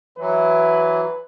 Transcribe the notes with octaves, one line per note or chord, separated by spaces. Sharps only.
E3 F#3 B4